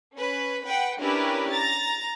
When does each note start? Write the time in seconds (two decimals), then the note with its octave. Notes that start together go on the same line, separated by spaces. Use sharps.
0.16 C#4 B4
0.64 B4 F#5 G5
1.00 C#4 D4 E4 G4 A#4 B4
1.52 A#5 A6